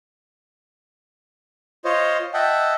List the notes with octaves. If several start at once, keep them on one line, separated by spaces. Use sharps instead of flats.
F4 C5 C#5 D#5
D#5 E5 F#5 G5 A5